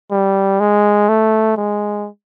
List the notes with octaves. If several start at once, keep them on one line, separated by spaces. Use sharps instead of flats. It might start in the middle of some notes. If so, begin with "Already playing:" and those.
G3
G#3
A3
G#3